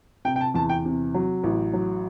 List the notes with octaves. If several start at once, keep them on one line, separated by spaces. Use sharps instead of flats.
C3 G5
G5
A5
E2 A5
G5
C3
F#3
A1
F#3